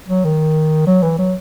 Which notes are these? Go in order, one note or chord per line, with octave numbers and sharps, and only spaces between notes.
F#3
D#3
F#3
E3
F#3